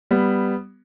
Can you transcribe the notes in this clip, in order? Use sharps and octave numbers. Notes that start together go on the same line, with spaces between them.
G3 B3